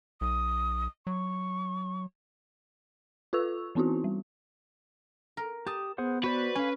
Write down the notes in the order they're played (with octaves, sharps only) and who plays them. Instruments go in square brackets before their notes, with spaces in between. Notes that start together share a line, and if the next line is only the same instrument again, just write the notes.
[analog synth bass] B1 [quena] D#6
[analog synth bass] F#3 [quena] C#6
[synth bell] F4 A4 B4 C#6 E6 F7
E3 B3 C4 D#4 E4 F#4
G3
[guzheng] A#4
[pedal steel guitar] G4 D#6 [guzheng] A5
[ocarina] B3 [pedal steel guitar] G#4 C5 F#5
[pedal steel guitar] F#4 C5 D5 [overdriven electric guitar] B4
[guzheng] C#4 [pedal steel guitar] F5 G#5